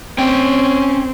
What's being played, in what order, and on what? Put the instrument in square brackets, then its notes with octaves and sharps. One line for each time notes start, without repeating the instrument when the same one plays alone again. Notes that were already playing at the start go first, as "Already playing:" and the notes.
[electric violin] C4 [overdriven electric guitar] C#4 G5